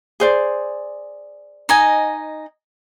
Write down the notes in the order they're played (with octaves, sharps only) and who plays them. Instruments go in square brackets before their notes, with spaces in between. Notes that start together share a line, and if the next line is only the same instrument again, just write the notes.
[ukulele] G#4 C5 D5
[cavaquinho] D#4 D#5 G#5